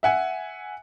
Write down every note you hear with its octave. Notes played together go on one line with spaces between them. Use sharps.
E5 F#5 G#5